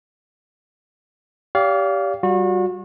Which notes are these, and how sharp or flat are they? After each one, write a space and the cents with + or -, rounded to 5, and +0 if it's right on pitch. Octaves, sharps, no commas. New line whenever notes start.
G4 +0 D5 -40 F5 +0
G3 -20 F#4 -35